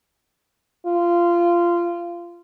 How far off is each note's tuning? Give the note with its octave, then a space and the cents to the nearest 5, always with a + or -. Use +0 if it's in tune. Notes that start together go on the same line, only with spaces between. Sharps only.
F4 -20